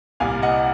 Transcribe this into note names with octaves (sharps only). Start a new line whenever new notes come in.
C2 A#2 F5 G#5
D#5 F#5